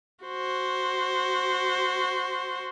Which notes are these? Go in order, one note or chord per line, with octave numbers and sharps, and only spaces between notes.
F#4 C5